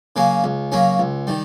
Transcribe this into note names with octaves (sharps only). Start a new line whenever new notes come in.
C#3 F#3 A#3 C#4
C#2
C#3 F#3 A#3 C#4
C#2
D#3 G3